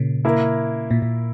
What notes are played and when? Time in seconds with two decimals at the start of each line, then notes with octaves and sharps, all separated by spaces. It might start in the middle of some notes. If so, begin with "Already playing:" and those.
Already playing: A#2 C#3
0.25 A#3 E4 A#4
0.91 A#2
1.02 A#2